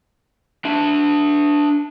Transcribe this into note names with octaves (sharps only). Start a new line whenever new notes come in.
D4 E5